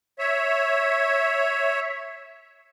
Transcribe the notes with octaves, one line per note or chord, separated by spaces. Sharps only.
C#5 E5